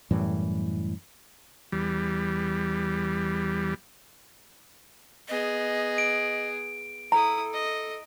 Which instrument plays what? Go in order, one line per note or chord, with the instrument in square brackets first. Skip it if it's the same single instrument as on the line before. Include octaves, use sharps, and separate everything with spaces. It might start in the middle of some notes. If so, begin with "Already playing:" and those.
[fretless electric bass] F#2 A2 E3 G3
[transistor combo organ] E2 G3
[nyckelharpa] B3 G#4 [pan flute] D#5
[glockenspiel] D7
[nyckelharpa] E4 D#6 [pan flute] A4 [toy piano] A#5
[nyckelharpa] D#5